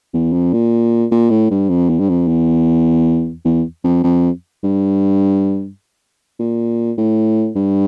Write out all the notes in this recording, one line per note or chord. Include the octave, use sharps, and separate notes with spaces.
E2
F2
A#2
A#2
A2
G2
F2
E2
G2
F2
E2
E2
F2
F2
G2
A#2
A2
G2